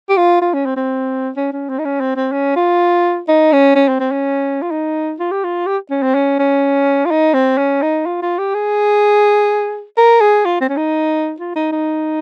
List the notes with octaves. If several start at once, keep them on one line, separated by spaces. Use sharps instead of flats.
G4
F4
F4
C#4
C4
C4
C#4
C#4
C4
D#4
C#4
C4
C4
C#4
F4
D#4
C#4
C#4
C4
C4
C#4
F4
D#4
F4
G4
F4
G4
C#4
C4
C#4
C#4
F4
D#4
C4
C#4
D#4
F4
F4
G4
G#4
A#4
G#4
F4
C4
C#4
D#4
F4
D#4
D#4